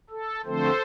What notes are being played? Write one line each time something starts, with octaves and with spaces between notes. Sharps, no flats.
A4
D3 F3 A3 C4 A4 C5